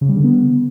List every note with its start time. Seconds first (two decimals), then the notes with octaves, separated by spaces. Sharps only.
0.01 C#3
0.09 G3
0.16 D3
0.24 B3